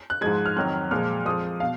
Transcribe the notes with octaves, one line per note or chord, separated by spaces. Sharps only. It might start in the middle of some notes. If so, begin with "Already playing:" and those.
F#6
G#2 F3 G#3 G#6
F6
F2 D#3 F#3 F#6
A#2 F3 G#3 F6
F2 F3 G#3 D#6
B2 F5